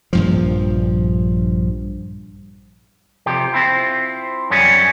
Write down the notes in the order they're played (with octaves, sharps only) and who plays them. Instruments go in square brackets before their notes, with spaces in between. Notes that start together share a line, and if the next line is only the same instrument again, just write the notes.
[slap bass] A#1 G2 F3
[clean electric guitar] F2 C3 G4
C4 E4 F4
F#2 F#3 G3 C#4 G#4